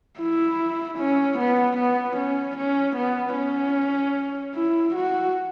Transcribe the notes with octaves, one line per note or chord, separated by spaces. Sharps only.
E4
C#4
B3
B3
C#4
C#4
B3
C#4
E4
F#4